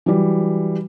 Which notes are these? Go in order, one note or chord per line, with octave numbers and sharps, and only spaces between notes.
E3 F#3 G3